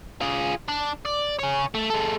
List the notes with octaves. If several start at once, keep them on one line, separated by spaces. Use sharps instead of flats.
F4 G#4
D4
D5
G#4 C#5
A3
G#3 A4